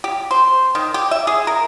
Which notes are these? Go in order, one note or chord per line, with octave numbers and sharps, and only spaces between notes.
G4
C5
D#3
G4
E5
G#4
A#4